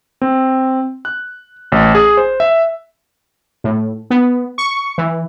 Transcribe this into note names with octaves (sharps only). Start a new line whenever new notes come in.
C4
F#6
A1
G#4
C5
E5
A2
B3
C#6
E3